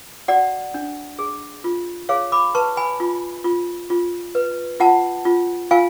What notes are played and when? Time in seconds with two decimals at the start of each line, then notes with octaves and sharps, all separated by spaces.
0.28 F#4 D5 F#5
0.74 D4
1.19 G#4
1.64 F4
2.09 G#4 C#5 F5
2.32 B5 D6
2.55 B4 A5 C#6
2.77 G#5 B5
3.00 F4
3.44 F4
3.90 F4
4.35 B4
4.80 F4 F#5 A5
5.25 F4
5.71 F4 F5 G#5